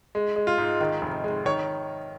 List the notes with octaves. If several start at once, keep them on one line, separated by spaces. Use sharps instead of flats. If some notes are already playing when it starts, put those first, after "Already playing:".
G#3
G#3
F4
G#2
D#3
F1
G#3
D#3 C#5